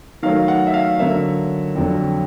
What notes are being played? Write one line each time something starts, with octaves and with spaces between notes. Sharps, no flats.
D#3 F#3 A3 F5
F#5
E5
F5
D3 F#3 A#3 E5
F2 D3 F#3